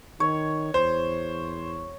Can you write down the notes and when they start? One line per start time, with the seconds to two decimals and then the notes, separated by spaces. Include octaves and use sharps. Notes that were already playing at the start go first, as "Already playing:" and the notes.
0.20 D#3 C#5
0.74 E2 C5